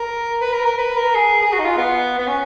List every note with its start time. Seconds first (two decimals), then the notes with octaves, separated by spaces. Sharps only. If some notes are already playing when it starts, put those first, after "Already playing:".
Already playing: A#4
0.41 B4
0.53 A#4
0.65 A#4
0.78 B4
0.96 A#4
1.15 G#4
1.41 G#4
1.53 F#4
1.59 D#4
1.64 F4
1.77 B3
2.18 B3
2.27 C#4